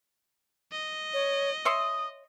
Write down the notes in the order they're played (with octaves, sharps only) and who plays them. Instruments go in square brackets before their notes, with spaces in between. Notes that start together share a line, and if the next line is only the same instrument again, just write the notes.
[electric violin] D#5
[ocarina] C#5
[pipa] C#5 E5 C6 [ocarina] D#6